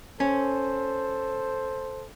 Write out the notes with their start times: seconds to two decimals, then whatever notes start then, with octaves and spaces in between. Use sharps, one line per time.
0.20 C#4 A4 C5